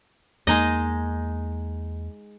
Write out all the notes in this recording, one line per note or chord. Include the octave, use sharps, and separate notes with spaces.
E2 G#3 A#3 D#4 D#5